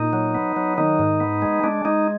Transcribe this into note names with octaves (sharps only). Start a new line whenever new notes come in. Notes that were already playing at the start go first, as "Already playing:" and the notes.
Already playing: A#2 D#4
F#3
B3
F#3
D#3 D#4
G#2
B3
G#3
G#3 D4
G#3 D#4